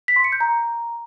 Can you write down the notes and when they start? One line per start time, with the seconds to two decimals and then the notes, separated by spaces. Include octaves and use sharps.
0.08 B6
0.16 C6
0.24 C#7
0.32 G6
0.41 A#5